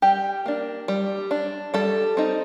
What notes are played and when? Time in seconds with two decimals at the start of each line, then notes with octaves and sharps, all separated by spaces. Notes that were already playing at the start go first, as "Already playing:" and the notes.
0.02 G3 G4
0.46 A#3 D4
0.88 G3
1.31 D4
1.74 G3 A4
2.17 C4 D#4